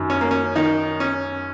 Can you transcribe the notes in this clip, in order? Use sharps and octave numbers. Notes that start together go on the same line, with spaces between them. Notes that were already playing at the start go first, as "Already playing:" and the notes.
Already playing: F#2 D#3
C#4
A#3
C#4
D#3 D#4
C#4